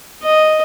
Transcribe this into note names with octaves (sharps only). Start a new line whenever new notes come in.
D#5